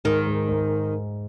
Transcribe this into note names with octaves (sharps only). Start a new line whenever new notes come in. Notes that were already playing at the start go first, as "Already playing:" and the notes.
G#2 D#3
G#2
G#2